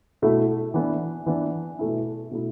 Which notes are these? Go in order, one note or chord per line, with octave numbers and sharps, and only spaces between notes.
B2 A3 E4
E3 B3 D4
E3 B3 D4
B2 A3 E4
B2 A3 E4